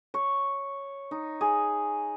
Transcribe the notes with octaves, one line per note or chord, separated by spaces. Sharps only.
C#5
D#4
G#4